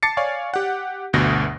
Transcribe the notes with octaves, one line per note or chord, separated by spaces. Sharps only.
A5 D6 A6 C7 C#7
C#5 D5 F5 G#5 C#6
G4 F#5
G1 D2 B2 A#6